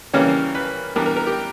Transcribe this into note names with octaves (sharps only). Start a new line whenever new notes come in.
C#3 E3 G3 A#3 C#4 C#5
B4
E3 G3 B3 D4 A#4
A#4
A#4
G4